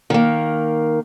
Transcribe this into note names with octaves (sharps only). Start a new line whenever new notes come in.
D#3 A#3